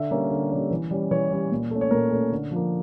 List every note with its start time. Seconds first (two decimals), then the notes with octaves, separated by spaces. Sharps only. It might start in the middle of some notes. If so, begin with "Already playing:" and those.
Already playing: D3 E5
0.11 G3 A#3 C#4
0.31 D3
0.51 G3 A#3 C#4
0.71 E3
0.91 G3 C#4
1.11 E3 C#5
1.31 G3 C#4
1.51 A#2
1.71 A3 C#4
1.81 C#5
1.91 A#2 A#4
2.11 A3 C#4
2.32 D3
2.51 F3 A#3